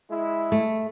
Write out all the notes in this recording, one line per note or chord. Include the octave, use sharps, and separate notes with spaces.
G#3 E4
A3